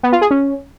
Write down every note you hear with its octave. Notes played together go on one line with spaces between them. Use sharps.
B3
F4
G#4
C#4